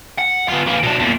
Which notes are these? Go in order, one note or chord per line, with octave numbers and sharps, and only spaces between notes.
F#5
B3 F4
E3 A#3
B2 D4
E2 A#2